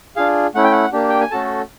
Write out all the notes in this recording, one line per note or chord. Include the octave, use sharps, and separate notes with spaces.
D4 F4 G#4 F5
A3 C#4 E4 F#5
G5
F#5
A#3 D4 G4
G5
G#5
A3 C#4 F#4 A4 A5